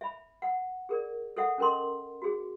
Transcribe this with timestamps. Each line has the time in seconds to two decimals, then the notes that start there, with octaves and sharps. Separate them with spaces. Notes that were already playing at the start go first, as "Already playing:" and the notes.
0.01 E5 B5
0.42 F#5
0.89 G#4 A#4 D5
1.37 A4 C#5 E5 F#5
1.58 C#4 A4 A#4 D#5 C6
2.22 F#4 G#4